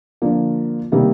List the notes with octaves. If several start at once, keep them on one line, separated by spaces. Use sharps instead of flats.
D3 F3 A#3
C3 D#3 G3 A#3 D#4